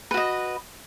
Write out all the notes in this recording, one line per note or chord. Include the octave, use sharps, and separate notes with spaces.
F#4 B4 D#5